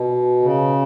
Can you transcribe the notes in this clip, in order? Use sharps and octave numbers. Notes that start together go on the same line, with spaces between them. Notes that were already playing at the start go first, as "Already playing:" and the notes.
Already playing: B2
C#3